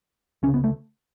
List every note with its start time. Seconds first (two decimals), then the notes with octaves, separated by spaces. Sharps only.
0.43 C#2 C#4
0.48 C#3
0.54 B3
0.64 A3